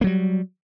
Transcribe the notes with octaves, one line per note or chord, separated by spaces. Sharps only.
F#3 G3 A#3